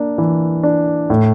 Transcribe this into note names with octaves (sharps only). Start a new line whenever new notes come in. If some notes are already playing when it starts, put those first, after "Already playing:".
Already playing: A#3 D4
E3
D4
A2